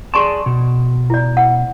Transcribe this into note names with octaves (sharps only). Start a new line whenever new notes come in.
G#4 D5 A5 C6 C#6
B2
E4 D5
F#5